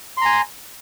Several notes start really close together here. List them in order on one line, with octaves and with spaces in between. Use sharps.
C6 A#5 G#5